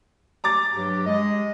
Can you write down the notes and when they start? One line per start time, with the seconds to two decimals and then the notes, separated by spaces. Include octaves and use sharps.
0.44 A#5 D6 A6
0.75 G2 F#3 G4
1.06 G#3 D#5